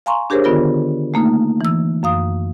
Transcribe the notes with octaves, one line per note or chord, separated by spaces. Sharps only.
F5 G#5 A#5 C6 C#6
D4 G4 G#4 A#4 C5 C#5
D3 D#3 B3 F4 A#4
A3 A#3 D#4
E3 E6
F#2 F5 D#6